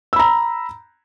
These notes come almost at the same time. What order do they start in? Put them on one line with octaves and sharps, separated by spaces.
E6 B5 A#5